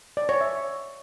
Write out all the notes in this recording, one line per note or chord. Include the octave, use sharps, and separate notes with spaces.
D5
C#5
E5